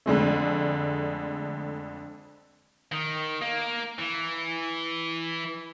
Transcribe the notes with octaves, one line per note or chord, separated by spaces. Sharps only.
F2 D3 G#3 A3
D#3
A#3
E3